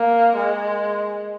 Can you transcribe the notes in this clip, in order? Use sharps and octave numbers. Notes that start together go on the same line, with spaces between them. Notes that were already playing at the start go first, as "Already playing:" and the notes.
Already playing: A#3
G#3